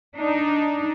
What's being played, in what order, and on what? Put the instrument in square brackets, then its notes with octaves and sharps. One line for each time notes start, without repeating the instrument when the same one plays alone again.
[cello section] D4 D#4